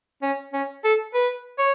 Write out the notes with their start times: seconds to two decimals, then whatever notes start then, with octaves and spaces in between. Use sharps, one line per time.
0.22 C#4
0.53 C#4
0.84 A4
1.14 B4
1.58 C#5